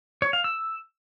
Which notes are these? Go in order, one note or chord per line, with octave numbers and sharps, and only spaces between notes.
C#5
F5
E6